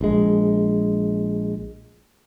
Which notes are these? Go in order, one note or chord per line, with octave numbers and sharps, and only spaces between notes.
A#1 G#3